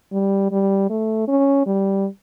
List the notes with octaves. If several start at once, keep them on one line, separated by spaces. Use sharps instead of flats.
G3
G3
A3
C#4
G3